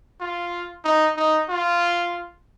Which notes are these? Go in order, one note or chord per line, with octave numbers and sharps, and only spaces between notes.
F4
D#4
D#4
F4